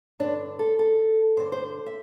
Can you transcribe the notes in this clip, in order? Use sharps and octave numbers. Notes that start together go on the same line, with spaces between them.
G2 D3 D4
A4
A4
G2 D3 C5
C5
E5